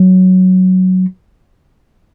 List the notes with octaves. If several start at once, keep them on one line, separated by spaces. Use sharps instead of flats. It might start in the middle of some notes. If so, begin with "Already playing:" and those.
Already playing: F#3